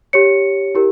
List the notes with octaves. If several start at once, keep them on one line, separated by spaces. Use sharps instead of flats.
G4 C#5 C#7
E4 G4 A#4